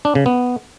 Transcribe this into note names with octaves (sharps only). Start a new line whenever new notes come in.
D4
C#3
B3